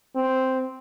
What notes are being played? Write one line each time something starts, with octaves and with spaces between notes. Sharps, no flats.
C4